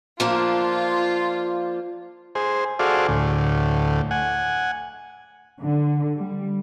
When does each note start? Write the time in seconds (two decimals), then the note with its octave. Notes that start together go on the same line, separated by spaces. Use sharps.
0.20 F3 A#3 D4 F4
2.35 G#4 C5
2.79 F#4 G#4 A4 C5 D5 F5
3.09 D2 A2
4.11 F#5 G#5
5.62 D3
6.18 G3